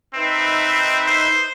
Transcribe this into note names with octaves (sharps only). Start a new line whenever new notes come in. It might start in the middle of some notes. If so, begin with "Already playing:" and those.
C4 D#4 B4 E5
C5